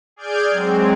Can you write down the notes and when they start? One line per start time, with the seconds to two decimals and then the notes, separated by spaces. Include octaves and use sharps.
0.16 G#4 D5 F6 G6 G#6 D7
0.50 F#3 G#3 C4